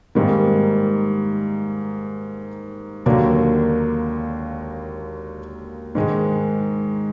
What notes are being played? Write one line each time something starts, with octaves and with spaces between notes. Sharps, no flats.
G#2 D#3 G3 A#3
D#2 D3 F#3 A#3 D4
G#2 D#3 G#3